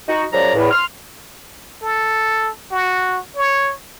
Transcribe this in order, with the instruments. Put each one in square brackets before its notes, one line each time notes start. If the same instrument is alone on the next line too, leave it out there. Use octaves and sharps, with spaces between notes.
[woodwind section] D#4 F#4
F#2 C#3 F3 F#3 D5 A#5
E2 A2
C6 F6
[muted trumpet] A4
F#4
C#5